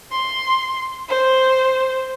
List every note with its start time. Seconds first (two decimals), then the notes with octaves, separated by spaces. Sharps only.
0.12 C6
1.09 C5